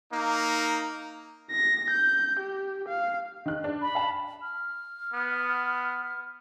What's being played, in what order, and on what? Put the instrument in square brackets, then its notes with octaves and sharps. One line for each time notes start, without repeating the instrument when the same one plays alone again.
[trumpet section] A#3 D#4
[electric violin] A#6
G6
G4
F5
[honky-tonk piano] D#3 F#6
D4
[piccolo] B5
[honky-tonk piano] F5 A5
[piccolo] F6
[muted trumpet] B3